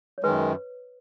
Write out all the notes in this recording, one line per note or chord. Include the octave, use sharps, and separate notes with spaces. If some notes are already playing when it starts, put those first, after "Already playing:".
C#5
F#2 D#3 G#3 B4